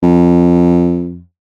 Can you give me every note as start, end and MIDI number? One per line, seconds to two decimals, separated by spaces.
0.03 1.21 41